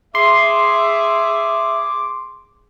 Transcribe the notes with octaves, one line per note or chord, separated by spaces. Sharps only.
G#4 E5 C6 D6